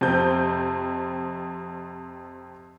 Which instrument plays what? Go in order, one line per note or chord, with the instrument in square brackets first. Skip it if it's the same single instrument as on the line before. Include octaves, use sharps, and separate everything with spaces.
[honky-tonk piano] F2 C3 G6